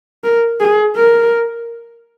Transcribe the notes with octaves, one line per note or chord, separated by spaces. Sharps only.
A#4
G#4
A#4